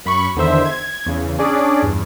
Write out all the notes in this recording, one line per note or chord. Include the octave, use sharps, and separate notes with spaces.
F#2 B5 C#6
E2 D3 D#3 C5 E5
G#6
E2 C#3
C#4 D4 G#4 D5
E2 G2